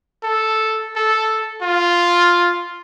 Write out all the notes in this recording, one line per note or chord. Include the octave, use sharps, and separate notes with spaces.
A4
A4
F4